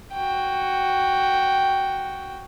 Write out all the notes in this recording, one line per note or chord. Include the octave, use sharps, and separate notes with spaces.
F#4 G5